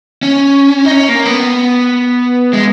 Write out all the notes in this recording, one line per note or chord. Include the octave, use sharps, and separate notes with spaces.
C#4
D#4
C#4
A#3
B3
G#3